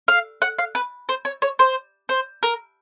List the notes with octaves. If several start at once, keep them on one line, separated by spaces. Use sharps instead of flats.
F5
F#5
F5
B4
C5
C#5
C#5
C5
C5
A#4